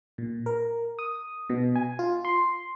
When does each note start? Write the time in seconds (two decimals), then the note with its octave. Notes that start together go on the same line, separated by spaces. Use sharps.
0.18 A#2
0.46 A#4
0.99 D#6
1.50 B2
1.76 G#5
1.99 F4
2.25 C6